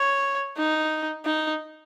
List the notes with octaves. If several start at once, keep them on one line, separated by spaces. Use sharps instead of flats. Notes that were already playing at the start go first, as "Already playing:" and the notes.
Already playing: C#5
D#4
D#4